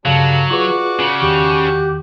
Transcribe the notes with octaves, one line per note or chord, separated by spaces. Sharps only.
G2 C#3 F#3 G3 D4 A4 F5
F4 F#4 G#4 B4 D5 C#6
C#3
E2 D#3 G4